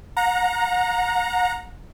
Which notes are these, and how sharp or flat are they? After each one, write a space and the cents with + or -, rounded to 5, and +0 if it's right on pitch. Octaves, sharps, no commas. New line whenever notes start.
F#5 -35 A#5 +0